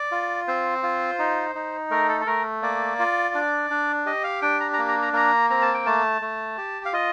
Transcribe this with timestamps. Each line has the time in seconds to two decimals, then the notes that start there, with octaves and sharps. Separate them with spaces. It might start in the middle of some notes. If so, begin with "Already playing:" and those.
Already playing: D5
0.12 F4
0.47 C4 C5
0.83 F4
1.19 D#4
1.55 D#4
1.90 A3 A#4
2.09 A4
2.21 A4
2.27 A3 A#4
2.62 A#3 D5
2.99 F4
3.34 D4
3.70 D4
4.06 G4 D#5
4.24 F5
4.42 D4 G5
4.60 A#5
4.74 A#5
4.78 A#3
4.88 A#5
5.02 A#5
5.13 A#3 A#5
5.50 C4 A#5
5.62 A5
5.74 G5
5.86 A3 A5
6.22 A3
6.58 G4
6.85 F5
6.93 F4 D#5